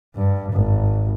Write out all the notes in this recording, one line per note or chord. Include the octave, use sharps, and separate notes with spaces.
G2
G#1